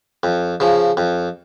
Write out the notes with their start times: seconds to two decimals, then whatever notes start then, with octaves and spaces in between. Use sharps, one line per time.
0.23 F2
0.60 C#3 F3
0.97 F2